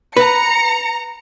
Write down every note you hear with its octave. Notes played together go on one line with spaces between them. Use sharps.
B4 A#5 A#6 C#7